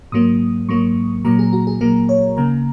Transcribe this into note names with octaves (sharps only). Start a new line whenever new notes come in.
G#2 F#3 A#3 D#6
G#2 F#3 A#3 C#6
A#2 F#3 A#3 A#5
G#4
F#4
G#4
A#2 F#3 A#3 A#4
C#5
C#2 C#3 A#3 A#5